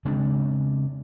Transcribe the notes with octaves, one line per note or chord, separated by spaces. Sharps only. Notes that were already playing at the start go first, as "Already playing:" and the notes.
C#3 G#3 C4 D4